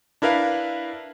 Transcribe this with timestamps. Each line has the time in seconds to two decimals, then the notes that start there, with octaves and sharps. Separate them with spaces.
0.22 D4 E4 A#4 B4 F5